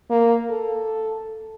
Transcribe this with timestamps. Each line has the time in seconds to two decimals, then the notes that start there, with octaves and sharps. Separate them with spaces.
0.10 A#3
0.51 A4